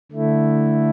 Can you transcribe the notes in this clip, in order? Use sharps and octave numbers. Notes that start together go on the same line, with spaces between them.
D3 A3 E4